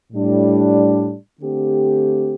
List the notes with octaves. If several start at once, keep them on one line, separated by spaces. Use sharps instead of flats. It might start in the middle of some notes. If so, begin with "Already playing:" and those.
A2 G3 D4
D3 A3 C4 G4